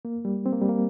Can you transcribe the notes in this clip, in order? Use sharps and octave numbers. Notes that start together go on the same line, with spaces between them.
A#3
G3
C4
A#3
G3
A#3